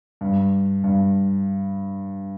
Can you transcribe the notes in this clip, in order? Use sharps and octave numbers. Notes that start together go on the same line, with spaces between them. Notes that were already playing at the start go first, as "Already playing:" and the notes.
G2
G2